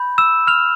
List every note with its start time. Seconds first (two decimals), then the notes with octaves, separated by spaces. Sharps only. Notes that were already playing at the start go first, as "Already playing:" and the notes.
Already playing: B5 G6
0.18 E6 E7
0.47 F6 F7